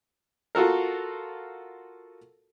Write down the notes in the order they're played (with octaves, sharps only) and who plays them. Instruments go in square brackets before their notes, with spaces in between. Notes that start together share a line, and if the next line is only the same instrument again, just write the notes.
[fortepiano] F4 F#4 A4 A#4